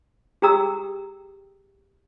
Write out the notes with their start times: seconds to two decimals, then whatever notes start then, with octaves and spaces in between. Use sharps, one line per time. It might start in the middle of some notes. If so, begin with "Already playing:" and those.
0.42 G4 G#4 G5 A#5 D#6 E6